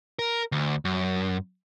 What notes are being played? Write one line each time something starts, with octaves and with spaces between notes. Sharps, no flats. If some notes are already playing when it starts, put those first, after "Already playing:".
A#4
D2
F#2